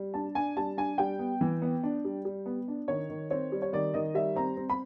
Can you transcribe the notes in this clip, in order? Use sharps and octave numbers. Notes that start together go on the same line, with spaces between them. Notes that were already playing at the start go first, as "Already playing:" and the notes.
Already playing: G3
D4 A5
D4 G#5
G3 A5
D4 G#5
G3 G5
B3
E3
B3
D4
G3
G3
B3
D4
D#3 C#5
D#3
C4 C#5
G3
C#5
D#3 D5
D#3 D#5
G3 E5
C4 A#5
C4
B5